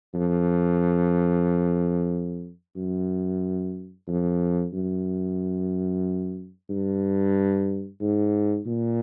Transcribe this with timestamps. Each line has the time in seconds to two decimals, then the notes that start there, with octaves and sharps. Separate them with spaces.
0.14 F2
2.76 F#2
4.08 F2
4.73 F#2
6.69 G2
8.01 G#2
8.66 A#2